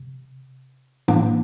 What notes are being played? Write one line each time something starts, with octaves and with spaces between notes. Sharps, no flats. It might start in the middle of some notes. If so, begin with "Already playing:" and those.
Already playing: C3
A2 E3 A#3 D4